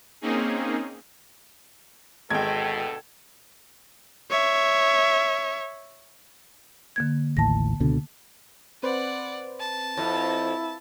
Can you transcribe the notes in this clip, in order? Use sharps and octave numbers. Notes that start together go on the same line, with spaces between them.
A#3 C4 C#4 D#4 G#4
G#1 D2 B2 A4 G5 G#6
C#5 E5
D3 A#3 G#6
A1 D#2 A2 A5 A#6
C#2 B2 D3
C4 B4 C5 D5 F#5
A5
F2 E4